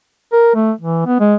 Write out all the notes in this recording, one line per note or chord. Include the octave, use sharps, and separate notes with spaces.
A#4
A3
E3
B3
G#3